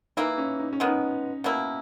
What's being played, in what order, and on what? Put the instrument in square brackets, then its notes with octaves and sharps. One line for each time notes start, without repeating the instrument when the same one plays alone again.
[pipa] E3 A#3 E4 [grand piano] D#4
[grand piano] C#4
D#4
C#4
[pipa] D#3 G#3 B3
[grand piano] D#4
[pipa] B2 A#3 E4